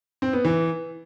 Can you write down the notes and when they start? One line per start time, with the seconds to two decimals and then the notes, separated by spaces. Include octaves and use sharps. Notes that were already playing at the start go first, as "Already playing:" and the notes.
0.22 C4
0.33 B3
0.45 E3